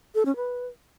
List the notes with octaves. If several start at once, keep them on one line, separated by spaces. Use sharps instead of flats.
A4
C#4
B4